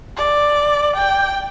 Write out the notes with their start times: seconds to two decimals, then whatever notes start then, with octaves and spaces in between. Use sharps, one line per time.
0.17 D5
0.96 G5